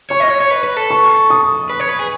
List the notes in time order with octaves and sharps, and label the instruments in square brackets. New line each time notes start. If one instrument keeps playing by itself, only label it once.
[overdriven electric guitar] C#5 [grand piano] C#6
[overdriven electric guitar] D#5
C#5
C#5
B4
B4
A4
[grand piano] C#6
D#6
[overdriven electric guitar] B4
C#5
B4
G#4